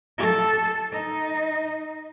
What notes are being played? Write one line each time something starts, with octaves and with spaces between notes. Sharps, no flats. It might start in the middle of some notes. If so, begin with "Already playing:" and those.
A4
D#4